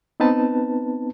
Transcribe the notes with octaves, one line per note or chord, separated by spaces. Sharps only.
B3 C4 D#4 B4 A5